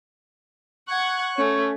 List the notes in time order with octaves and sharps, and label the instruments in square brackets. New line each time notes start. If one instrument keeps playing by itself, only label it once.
[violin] F#5 G#6 [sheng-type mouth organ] C#6 F#6
[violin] A3 [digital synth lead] C#4 [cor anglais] C#5